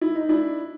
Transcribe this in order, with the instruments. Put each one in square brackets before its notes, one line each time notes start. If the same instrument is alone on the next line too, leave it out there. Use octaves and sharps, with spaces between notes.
[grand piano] E4
D#4
D4 E4